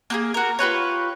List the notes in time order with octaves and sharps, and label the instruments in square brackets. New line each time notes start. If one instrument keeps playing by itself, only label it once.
[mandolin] A#3 G4 G#4
F#4 A#4
F4 G4 B4 C#5